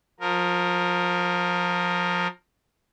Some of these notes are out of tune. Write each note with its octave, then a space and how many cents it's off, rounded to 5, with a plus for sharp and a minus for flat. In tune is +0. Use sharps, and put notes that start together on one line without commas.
F3 +25 A#4 +0